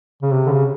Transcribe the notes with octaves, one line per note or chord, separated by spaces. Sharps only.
C#3
C3
D3
C#3